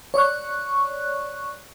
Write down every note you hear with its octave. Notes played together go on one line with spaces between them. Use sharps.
C#5 D5 C#6 F#6